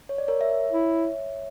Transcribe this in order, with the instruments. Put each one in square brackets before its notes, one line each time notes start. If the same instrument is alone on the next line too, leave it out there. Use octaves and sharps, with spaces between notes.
[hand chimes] C#5
D5
A#4 C#5
C#5 E5
[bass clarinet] E4